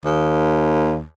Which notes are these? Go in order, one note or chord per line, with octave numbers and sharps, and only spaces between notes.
D#2